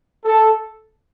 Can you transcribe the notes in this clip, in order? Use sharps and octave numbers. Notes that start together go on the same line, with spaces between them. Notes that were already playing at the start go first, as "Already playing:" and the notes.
A4